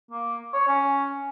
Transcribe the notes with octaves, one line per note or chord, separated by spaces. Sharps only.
A#3
C#5
C#4